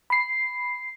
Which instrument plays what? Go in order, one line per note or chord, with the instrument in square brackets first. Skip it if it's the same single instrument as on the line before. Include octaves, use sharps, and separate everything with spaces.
[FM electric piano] B5 C7